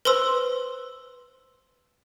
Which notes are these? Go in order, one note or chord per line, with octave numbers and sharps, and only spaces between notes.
B4 C5 C6 E6